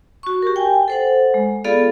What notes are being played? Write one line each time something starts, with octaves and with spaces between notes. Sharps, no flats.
F#4 C#6
G4 A#4
G5 G#5
A4 C5 F#5
G#3
B3 F4 G#4 A4 D5 F5